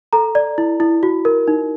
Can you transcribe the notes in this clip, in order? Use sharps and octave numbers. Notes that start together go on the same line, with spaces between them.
A4 A#5
D5
E4
E4
F#4
A#4
D#4